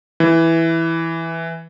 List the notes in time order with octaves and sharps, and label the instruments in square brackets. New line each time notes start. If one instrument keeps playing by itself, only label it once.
[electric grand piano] E3